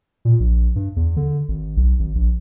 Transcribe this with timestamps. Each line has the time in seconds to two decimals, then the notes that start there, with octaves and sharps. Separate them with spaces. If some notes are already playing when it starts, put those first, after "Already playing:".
0.25 A#2
0.40 A#1
0.76 G2
0.96 E2
1.17 D3
1.48 G#1
1.77 B1
1.99 G#1
2.15 A#1